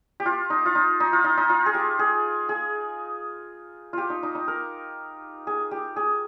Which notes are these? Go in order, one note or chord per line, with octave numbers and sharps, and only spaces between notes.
G4
F4
D#4
F4
D#4
D#4
F4
D#4
D#4
F4
G#4
G4
G#4
G#4
F4 G4
D#4
D#4
D#4
A#4
G#4
G4
G#4